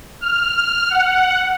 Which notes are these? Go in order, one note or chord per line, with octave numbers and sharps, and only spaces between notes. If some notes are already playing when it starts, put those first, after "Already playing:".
F6
F#5